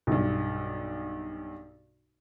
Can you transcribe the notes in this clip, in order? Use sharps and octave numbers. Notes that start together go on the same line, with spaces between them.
B1 G2